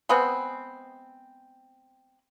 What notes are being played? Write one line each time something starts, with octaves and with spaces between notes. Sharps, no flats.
G#3 B3 C4